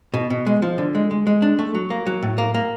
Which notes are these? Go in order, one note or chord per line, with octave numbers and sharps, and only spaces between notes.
B2
B2
G#3
F3
D3
G#3
G#3
G#3
D4
A3
F#3
A#3
F#3
A2
A#3
A#3